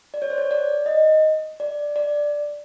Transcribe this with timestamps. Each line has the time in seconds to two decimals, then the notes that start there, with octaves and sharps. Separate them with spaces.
0.14 D5
0.22 C#5
0.30 C5
0.38 C#5
0.51 D5
0.86 D#5
1.60 D5
1.96 D5